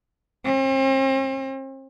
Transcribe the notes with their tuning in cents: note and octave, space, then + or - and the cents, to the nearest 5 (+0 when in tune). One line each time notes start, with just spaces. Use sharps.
C4 +40